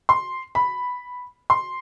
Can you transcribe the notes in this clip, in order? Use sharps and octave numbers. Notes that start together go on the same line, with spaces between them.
C6
B5
C6